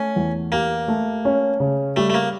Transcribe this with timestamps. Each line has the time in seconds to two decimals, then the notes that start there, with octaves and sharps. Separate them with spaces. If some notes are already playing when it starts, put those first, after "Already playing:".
Already playing: A3 C#4
0.16 E2
0.52 A#3 G4
0.88 A3
1.25 C#4
1.60 C#3
1.96 G3 A3
2.10 A3
2.14 A#3